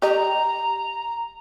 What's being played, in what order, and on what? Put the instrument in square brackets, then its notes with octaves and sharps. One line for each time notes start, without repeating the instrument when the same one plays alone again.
[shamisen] G4 D#5 [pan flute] A#5